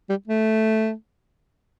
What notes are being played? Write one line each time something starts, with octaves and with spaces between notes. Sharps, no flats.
G3
A3